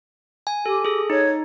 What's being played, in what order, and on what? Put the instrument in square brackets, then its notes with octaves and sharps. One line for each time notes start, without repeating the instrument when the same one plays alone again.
[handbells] G#5
[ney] G4 [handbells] A4
[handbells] G#4 A4
[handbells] D#4 [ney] C#5